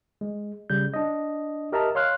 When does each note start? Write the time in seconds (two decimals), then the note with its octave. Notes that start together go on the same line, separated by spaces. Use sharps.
0.21 G#3
0.70 C#3 G3 G6
0.94 D4 D#5
1.72 G4 A#4 D#5 E5 A5 A#5
1.95 C#5 F5 C6 F6 F#6